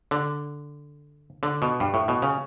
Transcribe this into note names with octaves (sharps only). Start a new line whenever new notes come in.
D3
D3
B2
G2
A2
B2
C#3